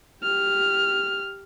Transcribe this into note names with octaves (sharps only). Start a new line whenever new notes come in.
G4 F6